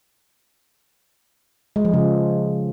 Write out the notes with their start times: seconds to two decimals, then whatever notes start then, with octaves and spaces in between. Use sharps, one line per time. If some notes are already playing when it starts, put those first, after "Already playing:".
1.76 G#3
1.85 F3
1.93 C#3